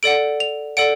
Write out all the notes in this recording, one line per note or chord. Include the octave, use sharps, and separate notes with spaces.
A4 D5 F#5 D7
F7
A4 D5 F#5 D7